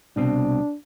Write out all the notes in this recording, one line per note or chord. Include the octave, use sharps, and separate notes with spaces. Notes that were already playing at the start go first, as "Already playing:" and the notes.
C2 B2 C4 D4